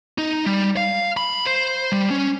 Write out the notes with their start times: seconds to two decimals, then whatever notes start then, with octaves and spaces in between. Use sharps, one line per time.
0.18 D#4
0.46 G3
0.77 F5
1.17 B5
1.46 C5
1.92 G3
2.11 C#4